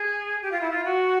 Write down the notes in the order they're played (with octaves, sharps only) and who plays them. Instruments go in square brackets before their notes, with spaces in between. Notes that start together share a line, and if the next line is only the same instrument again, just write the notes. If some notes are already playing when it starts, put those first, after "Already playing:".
Already playing: [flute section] G#4
G4
F4
E4
F4
F#4